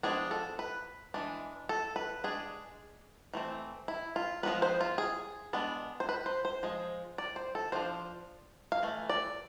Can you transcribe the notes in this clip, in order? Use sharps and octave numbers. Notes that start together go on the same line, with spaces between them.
F3 G#3 B3 D4 G#4
A4
B4
E3 G#3 D4
A4
B4
G#3 D4 G#4
E3 A3 C4
E4
F4
F3 G#3 B3 D4 B4
C5
F4
G#4
G#3 B3 D4
C5
B4
C5
C5
F3 G#3
D5
C5
A4
F3 A3 D4 C5
F5
E3 A3
D5